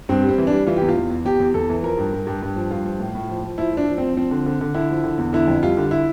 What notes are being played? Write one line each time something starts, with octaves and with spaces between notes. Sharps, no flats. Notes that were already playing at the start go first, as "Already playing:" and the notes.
G2 C4
G3
C4
E3
G3 D4
E3 F4
E2 G4
F4
E2
E2
E2 G4
E2
E2 A4
E3
F3 A#4
G2
G2
G2
G2
F3
G2 F4
F3
A2
A2
F3
F3
F3 E4
F3 D4
F3
F3 C4
F3 C4
D3
D3
D3
D3 E4
F3
D3
E2
D3 E4
F2
G3 F4
D3
E4